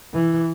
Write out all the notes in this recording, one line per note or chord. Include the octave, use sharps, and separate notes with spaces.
E3